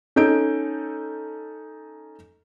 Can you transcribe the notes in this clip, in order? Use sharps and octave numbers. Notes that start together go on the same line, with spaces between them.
C#4 D#4 A4 G6 D7